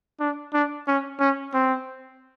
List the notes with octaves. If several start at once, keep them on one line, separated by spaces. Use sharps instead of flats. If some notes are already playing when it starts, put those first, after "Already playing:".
D4
D4
C#4
C#4
C4